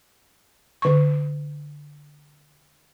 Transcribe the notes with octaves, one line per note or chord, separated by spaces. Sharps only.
D3 C#6